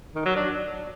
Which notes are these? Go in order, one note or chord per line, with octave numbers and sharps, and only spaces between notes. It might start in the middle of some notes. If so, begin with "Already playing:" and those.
D#3
F#3
D4